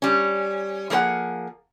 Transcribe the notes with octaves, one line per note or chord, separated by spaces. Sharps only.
G3 C#4
F3 A#3 G#4 B4 F#5